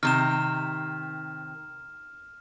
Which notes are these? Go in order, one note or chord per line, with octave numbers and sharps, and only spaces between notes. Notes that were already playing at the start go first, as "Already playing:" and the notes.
C3 D#3 F6 E7